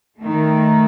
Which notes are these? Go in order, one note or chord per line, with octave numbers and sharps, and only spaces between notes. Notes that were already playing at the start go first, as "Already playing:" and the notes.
D#3 A3